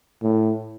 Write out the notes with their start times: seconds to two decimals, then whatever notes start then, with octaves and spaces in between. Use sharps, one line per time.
0.23 A2